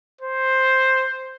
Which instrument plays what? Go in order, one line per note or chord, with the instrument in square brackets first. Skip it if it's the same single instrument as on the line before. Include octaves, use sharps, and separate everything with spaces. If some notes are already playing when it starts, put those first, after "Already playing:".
[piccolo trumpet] C5